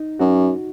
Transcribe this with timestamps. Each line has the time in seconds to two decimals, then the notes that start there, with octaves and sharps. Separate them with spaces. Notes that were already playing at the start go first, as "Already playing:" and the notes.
Already playing: D#4
0.19 F#2 F#4